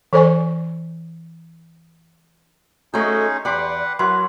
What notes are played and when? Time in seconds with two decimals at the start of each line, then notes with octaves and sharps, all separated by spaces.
0.13 E3 A4 C5 D5 G#5 C#6
2.94 A3 C#4 D#4 F#4 G#4 C5 D#5 C#6
3.45 E2 G4 B4 D5 F#5 C6 D6
3.99 F#3 E4 F#4 A#4 B4 C6